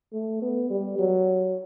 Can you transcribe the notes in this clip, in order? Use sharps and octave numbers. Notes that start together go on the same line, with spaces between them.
A3
B3
G3
F#3